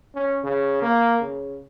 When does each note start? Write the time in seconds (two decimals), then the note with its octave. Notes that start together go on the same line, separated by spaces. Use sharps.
0.15 C#4
0.44 C#3
0.82 A#3
1.22 C#3